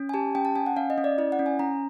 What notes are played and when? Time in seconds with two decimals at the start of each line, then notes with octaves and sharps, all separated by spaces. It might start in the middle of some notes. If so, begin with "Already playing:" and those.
Already playing: C#4
0.09 G#5
0.14 G4 A5
0.35 C#4 G5
0.45 A5
0.56 C#4 G#5
0.66 F#5
0.76 C#4 F5
0.90 D#5
0.98 C#4
1.04 D5
1.18 E4 D5
1.32 F#5
1.39 C#4
1.46 G#5
1.59 C#4 A#5